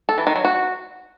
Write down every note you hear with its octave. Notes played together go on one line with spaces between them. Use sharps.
A4
E3
D#3
F#3
F#4